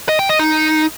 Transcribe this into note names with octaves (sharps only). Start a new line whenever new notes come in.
D#5
G5
D#5
D#4